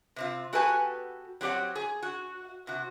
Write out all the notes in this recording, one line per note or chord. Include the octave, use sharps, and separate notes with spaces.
C3 C4 F4
B3 F#4 G4 A4 B4 G#5
F#3 C4 G4 C#5 F#5
G#4
F#4
C3 F#4